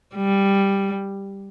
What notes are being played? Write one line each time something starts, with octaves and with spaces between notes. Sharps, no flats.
G3